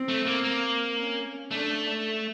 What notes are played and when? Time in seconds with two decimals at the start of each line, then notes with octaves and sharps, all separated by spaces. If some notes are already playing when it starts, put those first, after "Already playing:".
Already playing: C4
0.08 A3
0.26 A#3
0.44 A#3
0.98 C#4
1.51 A3 D4